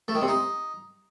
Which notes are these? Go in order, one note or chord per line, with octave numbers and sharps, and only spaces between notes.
A3
D#3
C3
D#4